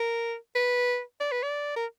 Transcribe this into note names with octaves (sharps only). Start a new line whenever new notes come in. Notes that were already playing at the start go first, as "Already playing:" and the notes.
Already playing: A#4
B4
D5
B4
D5
A#4